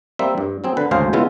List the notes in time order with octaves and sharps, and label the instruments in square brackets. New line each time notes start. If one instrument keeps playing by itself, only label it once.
[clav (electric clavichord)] G3 A#3 C4 E5
G2
F#3 C4 G#4
D3 B4
G#1 D2 C#3 G#4 C5 F5
C#3 G#3 B3 E4 F4